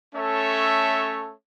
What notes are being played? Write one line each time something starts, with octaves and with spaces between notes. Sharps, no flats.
A3 C#4 A4 C#5 E5